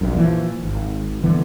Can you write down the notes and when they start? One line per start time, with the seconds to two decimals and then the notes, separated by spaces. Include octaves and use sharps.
0.01 A#1 F#2
0.17 A#2 E3 F3
0.63 G#1
1.23 C2 D3 E3 B3